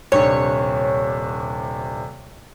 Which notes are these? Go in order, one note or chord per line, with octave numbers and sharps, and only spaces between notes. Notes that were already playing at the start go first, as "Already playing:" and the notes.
D#1 C3 D4 C#5